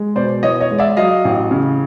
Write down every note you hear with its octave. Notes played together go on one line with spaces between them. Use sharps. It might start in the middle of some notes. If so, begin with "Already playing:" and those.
Already playing: G#3
B2 C5 D5
E3 C#5 D#5
C#5 D#5
G#3
D5 E5
F#3 D#5 F5
A1
C#3